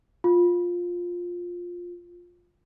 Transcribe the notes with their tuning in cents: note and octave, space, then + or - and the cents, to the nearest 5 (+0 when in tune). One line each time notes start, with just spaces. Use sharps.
F4 +10